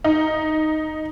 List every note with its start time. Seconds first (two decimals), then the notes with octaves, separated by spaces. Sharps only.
0.04 D#4